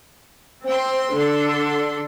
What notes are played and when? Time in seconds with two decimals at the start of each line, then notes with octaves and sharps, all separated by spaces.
0.66 C4 G5 C6
1.16 D3 D4 A4 C6